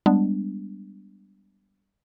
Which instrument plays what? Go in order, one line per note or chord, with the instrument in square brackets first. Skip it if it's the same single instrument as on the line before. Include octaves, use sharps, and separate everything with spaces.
[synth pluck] G3 G#3 B3 D4